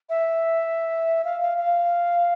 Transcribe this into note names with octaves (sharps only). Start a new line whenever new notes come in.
E5
F5
F5
F5